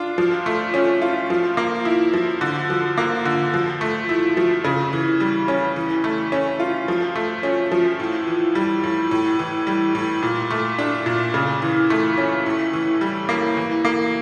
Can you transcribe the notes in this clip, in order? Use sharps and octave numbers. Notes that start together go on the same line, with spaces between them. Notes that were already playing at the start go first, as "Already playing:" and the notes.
Already playing: D4 F4
F3
A3
C#4
F4
F3
A#3
E4
F3
D3
F3
A#3
D3
F3
A3
E4
F3
C#3
E3
G3
C#4
E3
A3
C#4
F4
F3
A3
C#4
F3
A2
E3
G3
A2
A2
E3
G3
A2
A#2
A3
D4
A#2
C#3
E3
A3
C#4
A2
E3
G3
A#3
E3
A#3